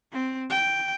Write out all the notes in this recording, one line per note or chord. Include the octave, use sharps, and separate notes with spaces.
C4
G5